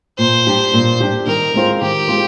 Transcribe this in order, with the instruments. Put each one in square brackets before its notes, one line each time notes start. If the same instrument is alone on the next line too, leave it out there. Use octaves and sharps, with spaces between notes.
[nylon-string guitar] A#2 [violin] C5
[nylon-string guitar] G3 D4 G4
A#2
G3 D4 G4
[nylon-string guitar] D#3 [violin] A#4
[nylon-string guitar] G#3 C4 F4 C5
[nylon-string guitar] D#3 [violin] G4
[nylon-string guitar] G#3 C4 F4 C5